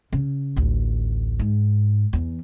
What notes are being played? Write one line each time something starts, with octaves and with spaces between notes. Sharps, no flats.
C#3
A1 D2
G#2
E2